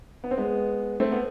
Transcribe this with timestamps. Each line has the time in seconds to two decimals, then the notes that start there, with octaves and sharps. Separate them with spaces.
0.24 B3
0.31 C4
0.37 G#3 B3
1.00 A3 C4
1.12 B3